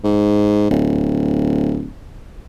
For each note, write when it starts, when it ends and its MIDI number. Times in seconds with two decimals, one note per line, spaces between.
0.04 0.69 44
0.70 1.88 26